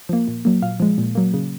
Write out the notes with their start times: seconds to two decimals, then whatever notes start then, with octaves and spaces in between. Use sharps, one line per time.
0.09 F3 A#3
0.28 A#2
0.45 F#3 A#3
0.62 A#2 F5
0.80 F3 G#3
0.98 A#2
1.15 F#3 A#3
1.34 C#3